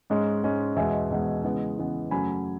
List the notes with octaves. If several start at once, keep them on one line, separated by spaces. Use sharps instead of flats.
G#2 G#3 C#4
G#2 G#3 C#4
E2 B2 G#3 E5 G#5
E2 B2 G#3
C#3 E3 G#3 B3
C#3 E3 G#3 B3
F#2 C#3 F#3 A3 C#4 G#5 B5